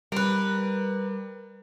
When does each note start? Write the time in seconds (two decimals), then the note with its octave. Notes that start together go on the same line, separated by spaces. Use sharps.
0.12 G3 A#4 B4